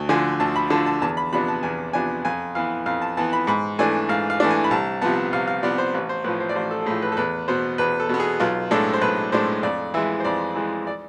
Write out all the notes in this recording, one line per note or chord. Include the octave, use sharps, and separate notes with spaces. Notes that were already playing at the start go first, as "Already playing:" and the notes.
Already playing: D2
D3 F3 G#5
D2 A5
B5
D3 F3 A5
A5
E2 A5
B5
C3 F3 B3 D4 B5
A5
E2 G#5
C3 F3 B3 D4 G#5
F2 G#5
E3 B3 F5
F2 F5
A5
E3 B3 A5
B5
G#2 B5
E3 A3 D4 G#5
G#2 F5
F5
E3 A3 D4
G#5
B5
C2 A5
C3 F3 B3 A5
C2 F5
F5
C3 F3 B3 D5
C5
A1 B4
C5
A2 F3 B4
C5
D5
A1 C5
A4
A4
A2 F3 G#4
B4
A4
E2 B4
B2 B3 C5
E2 B4
A4
B2 B3
G#4
B1 F4
A2 G#3 D4 A4
C5
B1 B4
A2 G#3 D4 C5
F2 D5
E3 G#3 E5
C5
F2 D5
E3 G#3
D5